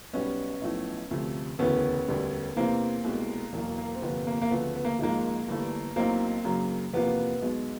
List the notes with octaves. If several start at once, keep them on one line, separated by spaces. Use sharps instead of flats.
B1 B2 G3 B3 C#4
B1 A2 F3 A3
D2 C3 F3 A3
E1 D2 C#3 E3 B3 C#4
E1 D2 D3 G3
E2 C3 E3 A#3 C4
C2 B2 G#3
E1 E2 B2 F#3 A#3
A#3
C4
G1 F2 C3 F3 A#3 B3
A#3
A#3
D2 C#3 F3 A3 B3
B3
A#3
G#1 G#2 F3 G#3 A#3
G1 G2 E3 A3
B1 A2 F#3 A#3 C4
F#2 C#3 F#3 A#3
E2 C3 F3 A#3 B3
B1 B2 G#3